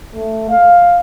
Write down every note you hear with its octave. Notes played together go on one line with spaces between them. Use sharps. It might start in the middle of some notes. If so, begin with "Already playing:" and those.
A3
F5